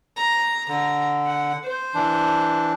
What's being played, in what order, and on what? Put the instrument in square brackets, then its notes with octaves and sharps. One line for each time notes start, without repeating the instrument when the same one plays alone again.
[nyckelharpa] A#5
[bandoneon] D3 [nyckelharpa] A#5
[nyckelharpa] F#5
C5
[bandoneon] E3 D4